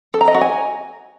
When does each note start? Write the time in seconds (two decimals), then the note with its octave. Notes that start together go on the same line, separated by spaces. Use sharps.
0.14 A4
0.21 A#5
0.28 D#5
0.34 F#4
0.41 G#5